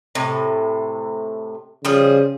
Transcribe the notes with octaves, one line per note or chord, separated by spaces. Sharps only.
A2 C3
C#3 F3 G3 G#4